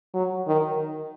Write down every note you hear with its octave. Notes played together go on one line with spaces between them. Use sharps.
F#3
D#3